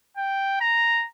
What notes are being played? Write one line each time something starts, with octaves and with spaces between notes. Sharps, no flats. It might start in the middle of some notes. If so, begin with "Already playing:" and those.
G5
A#5